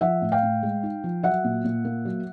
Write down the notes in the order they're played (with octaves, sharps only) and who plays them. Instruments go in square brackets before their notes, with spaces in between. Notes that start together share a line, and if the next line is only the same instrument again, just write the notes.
[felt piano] F3 E5 F#5
A2
F5 G5
A2
G#3
D#4
F3
F#3 E5 F#5
A#2
A#2
A#3
F#3